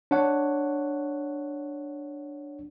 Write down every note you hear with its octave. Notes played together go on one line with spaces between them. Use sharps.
D4 C#5 F#5